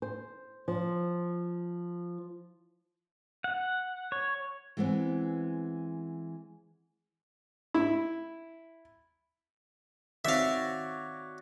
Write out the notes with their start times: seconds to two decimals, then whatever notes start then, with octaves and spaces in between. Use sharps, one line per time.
0.02 C5
0.68 F3
3.44 F#5
4.12 C#5
4.77 E3 G#3 B3 C4
7.74 E4
10.25 D#3 C4 F#4 C#5 D5 E5 F5